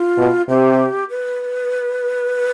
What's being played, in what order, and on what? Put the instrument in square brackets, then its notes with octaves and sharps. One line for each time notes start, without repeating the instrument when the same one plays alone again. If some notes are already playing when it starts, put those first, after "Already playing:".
Already playing: [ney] F4
[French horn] B2
[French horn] C3 [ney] G4
[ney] B4